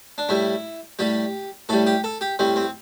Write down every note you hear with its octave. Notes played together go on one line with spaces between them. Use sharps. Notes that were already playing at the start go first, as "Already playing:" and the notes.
D4
A2 G3 E4
A2 G3 G4
A2 G3 A4
G4
A4
G4
A2 G3 C4
C4